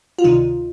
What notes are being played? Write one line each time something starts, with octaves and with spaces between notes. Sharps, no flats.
F4
D2 C3 D#3 D#4